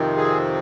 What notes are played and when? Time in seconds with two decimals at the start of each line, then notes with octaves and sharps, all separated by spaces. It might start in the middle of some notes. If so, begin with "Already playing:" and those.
Already playing: F2 C3 D#3 C4
0.17 G#4